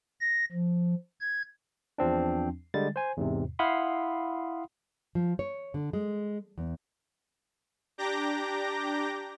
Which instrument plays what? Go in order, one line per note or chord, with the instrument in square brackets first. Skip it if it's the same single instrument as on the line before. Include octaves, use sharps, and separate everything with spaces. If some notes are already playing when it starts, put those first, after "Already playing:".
[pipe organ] A#6
F3
G#6
[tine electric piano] E2 F3 C4 D4
D3 G3 G#3 A6
C5 G#5
E2 G#2 C3
E4 F5 F#5 B5 C6 D#6
[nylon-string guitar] F3
C#5
D3
G#3
E2
[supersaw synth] D4 G4 A#5 D6 G6 A#6